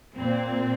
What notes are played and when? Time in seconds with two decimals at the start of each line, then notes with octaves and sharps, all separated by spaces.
0.16 A#2 C4